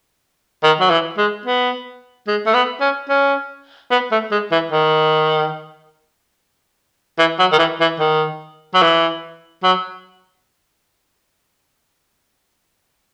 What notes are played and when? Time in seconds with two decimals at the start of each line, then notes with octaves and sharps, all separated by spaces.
0.63 D#3
0.80 F#3
0.90 E3
1.18 G#3
1.46 B3
2.27 G#3
2.46 A3
2.54 B3
2.81 C#4
3.09 C#4
3.91 B3
4.12 A3
4.31 G#3
4.52 E3
4.72 D#3
7.19 E3
7.39 F#3
7.52 D#3
7.59 E3
7.80 E3
8.00 D#3
8.74 F#3
8.82 E3
9.63 F#3